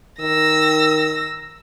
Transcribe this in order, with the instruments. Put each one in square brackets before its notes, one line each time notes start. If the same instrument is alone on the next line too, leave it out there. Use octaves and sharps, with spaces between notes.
[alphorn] D#3 [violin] E6 A#6